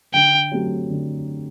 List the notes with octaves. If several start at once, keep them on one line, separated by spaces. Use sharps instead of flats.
D3 G5
F#3 A3 C4 G4
D3